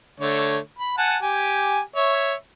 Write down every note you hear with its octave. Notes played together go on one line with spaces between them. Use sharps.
D3 A3 C#5
B5
F#5 G#5 A5
G4 G#5
C#5 E5